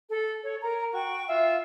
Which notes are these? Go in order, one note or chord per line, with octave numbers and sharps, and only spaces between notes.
A4
A4 C#5
A#4 A#5
F#4 G5 C#6
F4 E5 F5